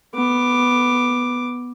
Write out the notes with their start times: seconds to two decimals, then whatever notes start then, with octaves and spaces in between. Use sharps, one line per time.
0.15 B3 D6